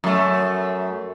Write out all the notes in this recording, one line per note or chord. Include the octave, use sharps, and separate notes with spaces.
F#2 A3